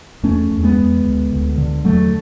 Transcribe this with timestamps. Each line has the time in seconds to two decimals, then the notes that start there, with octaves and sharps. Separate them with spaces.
0.23 E2 A3 C#4
0.51 E2
0.63 G#3 B3
0.78 E2
1.05 D2
1.32 D2
1.58 D3
1.85 E2 F#3 A3